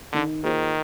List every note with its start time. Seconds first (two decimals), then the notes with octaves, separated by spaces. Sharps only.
0.13 D3 D#3
0.43 D#3 A#3 F4 G#4 C5